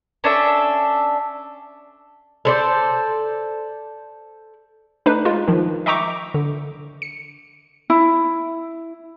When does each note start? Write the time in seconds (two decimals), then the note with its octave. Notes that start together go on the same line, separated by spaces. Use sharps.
0.24 C#4 D4 A4 E5
2.45 A4 C5 D5
5.06 A3 D4 D#4 B4
5.25 G#3 F4
5.48 D#3 F3
5.86 D#5 E5 G5 A#5 C#6 D6
6.34 D3
7.02 C#7
7.90 E4